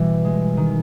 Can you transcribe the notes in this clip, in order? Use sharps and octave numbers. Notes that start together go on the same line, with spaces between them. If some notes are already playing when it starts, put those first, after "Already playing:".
Already playing: B2 E3 G3
G#3
D#3